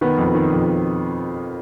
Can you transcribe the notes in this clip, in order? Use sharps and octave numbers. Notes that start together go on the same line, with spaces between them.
D#3 B3
F2
D#3
F2